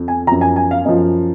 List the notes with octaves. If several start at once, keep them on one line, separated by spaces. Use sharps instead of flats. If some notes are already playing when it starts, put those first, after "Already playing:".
Already playing: F2
G#5
F#2 F3 A#5
G#5
G#5
F5
F#2 F3 D#5